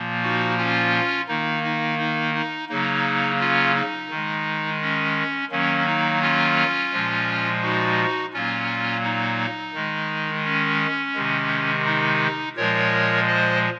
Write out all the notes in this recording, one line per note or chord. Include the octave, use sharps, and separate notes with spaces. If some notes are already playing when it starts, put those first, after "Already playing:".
Already playing: A#2 F3 A#3
D#4 F#4
C#4 F4
D#3 A#3 D#4
D#4
D#4
D#4
C#3 F#3 A#3 D#4
C#4 F4
D#4
D#3
G#3
C#4
D#3 F#3 A#3 C#4
D#4
C#4 F4
A#2 F3 G#3
D#4 F#4
A#2 F#3 A#3 C#4 F4
D#4
D#3 G#3
C#4
C3 D#3 G#3
D#4
A#2 F3 G#3 A#4 C#5
C5 D#5